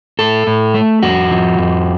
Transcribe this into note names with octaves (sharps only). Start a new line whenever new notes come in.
A2 A4
A2
A3
F2 F#4
F3
F2